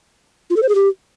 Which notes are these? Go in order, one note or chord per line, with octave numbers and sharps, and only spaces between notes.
F4
A4
C5
G#4
G4